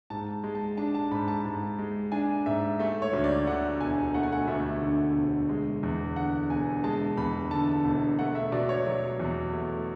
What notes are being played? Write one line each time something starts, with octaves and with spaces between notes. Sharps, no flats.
G#2 A5
G#3
A5
D4 A5
A5
G#2 B5
A5
G#2
G#3
D4 G#5
G#2 E5
A3 E5
C#5
D2
D5
D3 F#5
E1 G#5
A3 F#5
G#5
F#5
D2 E5
D3
E1
G#3
E2
D3 F#5
E1 G#5
G#3 A5
E2 B5
D3 A5
E1
A3 F#5
E5
B2 D5
C#5
F#3
E2
A3